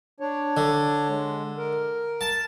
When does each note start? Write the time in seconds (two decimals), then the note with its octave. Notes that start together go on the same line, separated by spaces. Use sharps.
0.20 D4 C#5
0.57 D3
1.09 G#3
1.58 A#4
2.21 A5